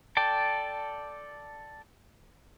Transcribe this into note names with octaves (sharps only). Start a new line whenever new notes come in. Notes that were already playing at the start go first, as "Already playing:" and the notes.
A4 D5 G5 A5